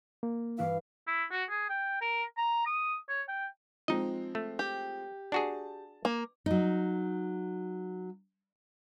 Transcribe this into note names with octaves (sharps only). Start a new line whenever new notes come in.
A#3
G2 E3 E4 F5
E4
F#4
G#4
G5
A#4
A#5
D#6
C#5
G5
F3 G#3 C4 D#4 D#5
A3
G4
D4 F#4 G#4 A5
A#3
F#3 D#4